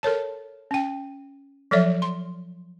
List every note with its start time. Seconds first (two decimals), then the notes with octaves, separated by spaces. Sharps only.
0.03 A4 A#4 C#5 A5
0.71 C#4 G5
1.71 F3 F#3 A4 C#5 D5 E5
2.02 C6